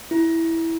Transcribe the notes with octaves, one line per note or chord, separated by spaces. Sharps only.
E4